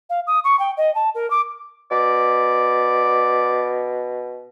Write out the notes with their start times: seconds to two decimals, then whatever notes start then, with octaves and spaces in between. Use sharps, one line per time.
0.10 F5
0.27 D#6
0.44 C#6
0.59 G5
0.77 D#5
0.95 A5
1.15 A#4
1.30 D6
1.91 B2 D5